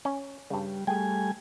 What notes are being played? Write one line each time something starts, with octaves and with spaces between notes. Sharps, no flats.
C#4
G2 C#3 G3
G3 A3 G#4 G5 G#5